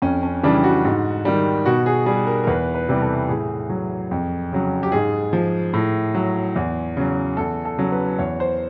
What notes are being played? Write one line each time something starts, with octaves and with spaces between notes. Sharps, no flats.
F2 C#4
C#4
C#3 E3 G3 D4
F#4
G#2
D#3 G3
B2 F#4
G#4
G3 G#4
A#4
A#4
E2 B4
B4
C3 E3 G3
A4
A2 G#4
F#3
F2
C#3 F#3
G4
G#2 G#4
F3
A2
F#3
E2
C#3 F#3
E2 A4
A4
C#3 F#3
B4
E2 C#5
C5